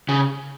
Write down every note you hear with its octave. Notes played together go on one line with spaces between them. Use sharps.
C#3